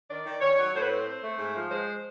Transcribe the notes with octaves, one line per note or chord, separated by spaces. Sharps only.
D#3 D5
D#3
D#3 C#5
F#3
A2 C5
B4
C4 C5
C4
A3
G#2
F3
G#3 C5